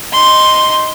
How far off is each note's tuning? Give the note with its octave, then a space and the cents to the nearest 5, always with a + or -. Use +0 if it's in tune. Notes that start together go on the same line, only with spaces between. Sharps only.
D#4 +0 C6 +0